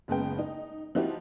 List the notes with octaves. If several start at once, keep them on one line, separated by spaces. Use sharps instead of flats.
F#1 C#3 G#3 B3 G5
D#4
F3 C4 D#4 E4 F#4 G4